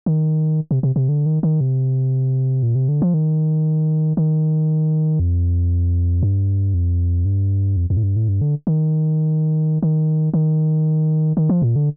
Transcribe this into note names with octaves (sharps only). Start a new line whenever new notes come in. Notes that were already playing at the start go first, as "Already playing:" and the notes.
D#3
C3
C3
C3
D3
D#3
D#3
C3
A#2
C3
D3
F3
D#3
D#3
F2
G2
F2
G2
F2
F2
A2
G2
A2
G2
D3
D#3
D#3
D#3
D#3
F3
A#2
D3